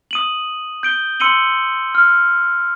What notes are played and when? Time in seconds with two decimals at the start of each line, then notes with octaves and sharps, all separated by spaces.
0.11 D#6 D#7 F#7
0.83 G6 D7 G7
1.20 C6 E6 C#7 D#7 F#7 G7
1.95 F6